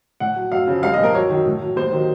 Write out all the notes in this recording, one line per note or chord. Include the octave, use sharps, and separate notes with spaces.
A2 F#5
F#3
F#2 F5
C#3 F3
C2 F5
D#5
A#2 F3 A#4
F#2 C#5
D#3 F#3
A2
F#3
D#2 C5
D#3 F#3